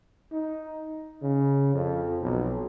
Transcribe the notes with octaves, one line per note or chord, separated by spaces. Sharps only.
D#4
C#3
F2
B1